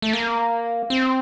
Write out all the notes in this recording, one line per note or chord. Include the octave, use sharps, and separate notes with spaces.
A3
A#3
C4